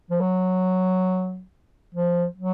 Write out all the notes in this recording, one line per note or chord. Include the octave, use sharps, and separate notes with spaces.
F3
F#3
F3
F#3